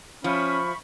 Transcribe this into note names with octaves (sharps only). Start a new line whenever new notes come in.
F3 C#4 E5 B5 C#6